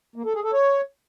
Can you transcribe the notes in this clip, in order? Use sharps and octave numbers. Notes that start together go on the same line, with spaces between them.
A#3
A4
G#4
A4
C#5